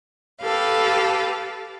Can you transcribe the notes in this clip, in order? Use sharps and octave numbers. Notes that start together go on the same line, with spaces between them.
G4 A4 B4 F5